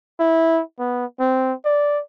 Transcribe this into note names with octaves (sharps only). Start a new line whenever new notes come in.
E4
B3
C4
D5